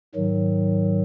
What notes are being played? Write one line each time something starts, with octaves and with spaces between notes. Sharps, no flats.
G#2 D#3 F#3